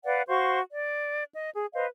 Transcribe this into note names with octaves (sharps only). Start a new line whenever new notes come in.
B4 D5 F5 F#5
F#4 C5 F5 C#6
D5
D#5
G#4
B4 C5 D#5 F5